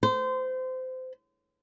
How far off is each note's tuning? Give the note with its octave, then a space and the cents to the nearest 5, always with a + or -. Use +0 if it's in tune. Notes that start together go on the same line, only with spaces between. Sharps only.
C5 -25